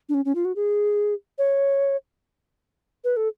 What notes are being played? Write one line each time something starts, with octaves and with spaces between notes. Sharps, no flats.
D4
C#4
C#4
F4
F#4
G#4
C#5
B4
A4